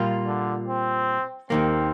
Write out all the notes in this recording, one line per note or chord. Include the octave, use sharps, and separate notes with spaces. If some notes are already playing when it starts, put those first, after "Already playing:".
Already playing: A#2 G3 A#3 F4
D3
C4
D#2 D#3 A#3 C4